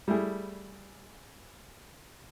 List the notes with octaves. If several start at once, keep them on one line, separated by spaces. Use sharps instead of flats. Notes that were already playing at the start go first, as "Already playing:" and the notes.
G3 A3 E4 G#4